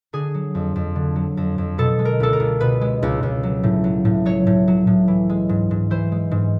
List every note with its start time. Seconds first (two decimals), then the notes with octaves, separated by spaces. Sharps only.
0.13 D3 G#4
0.34 F#3
0.55 F2
0.76 F2
0.96 D3
1.16 F#3
1.37 F2
1.58 F2
1.78 B2 A4
1.99 G#3
2.05 A#4
2.20 C#2 A4
2.33 A#4
2.40 C#2
2.61 B2 B4
2.81 G#3
3.03 C#2
3.23 C#2
3.43 F#3
3.63 A2
3.84 F#3
4.05 A2
4.26 F#3 C#5
4.47 A2
4.68 F#3
4.87 A2
5.08 E3
5.30 G#3
5.49 G#2
5.71 G#2
5.90 E3 C5
6.12 G#3
6.31 G#2